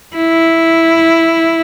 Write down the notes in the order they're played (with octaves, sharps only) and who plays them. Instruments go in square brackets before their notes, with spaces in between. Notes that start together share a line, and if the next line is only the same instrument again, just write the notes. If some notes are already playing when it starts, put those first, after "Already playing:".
[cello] E4